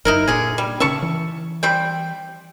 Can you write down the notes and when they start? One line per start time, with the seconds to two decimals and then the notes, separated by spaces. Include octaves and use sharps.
0.05 F#1 D#4 E4 A#4
0.27 A#2 D3 G#4
0.58 G3
0.80 C#3 C#4 E5 A5 C#6
1.02 E3
1.63 G3 C4 G5